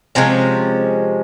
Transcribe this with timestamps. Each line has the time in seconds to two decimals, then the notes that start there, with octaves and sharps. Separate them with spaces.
0.15 C3 F3 G#3 C#4